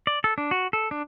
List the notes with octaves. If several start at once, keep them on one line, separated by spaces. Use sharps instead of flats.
D5
A4
D4
F#4
A4
D4